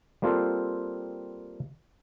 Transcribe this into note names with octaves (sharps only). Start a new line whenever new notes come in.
G3 A#3 C4 F4 A4 C5